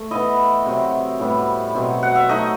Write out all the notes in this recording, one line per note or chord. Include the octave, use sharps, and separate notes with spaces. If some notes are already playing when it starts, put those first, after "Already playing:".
Already playing: A3
E3 B3 E4 D#5
C3 F#3 C4
A2 G3 B3
B2 F#3 C4
F#5
E5
F#3 A3 D#4 D#5